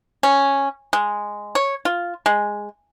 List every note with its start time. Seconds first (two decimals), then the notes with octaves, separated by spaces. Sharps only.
0.23 C#4
0.93 G#3
1.55 C#5
1.85 F4
2.26 G#3